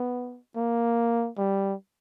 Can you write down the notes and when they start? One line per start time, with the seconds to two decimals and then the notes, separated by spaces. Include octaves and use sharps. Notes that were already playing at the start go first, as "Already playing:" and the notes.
Already playing: B3
0.56 A#3
1.38 G3